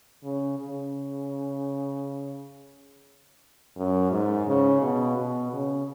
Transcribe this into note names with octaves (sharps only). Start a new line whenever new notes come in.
C#3
C#3
F#2
G#2
C#3
B2
B2
C#3